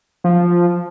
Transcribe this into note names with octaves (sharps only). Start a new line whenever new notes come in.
F3